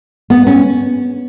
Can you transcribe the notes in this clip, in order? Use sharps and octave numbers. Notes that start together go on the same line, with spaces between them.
B3
C#4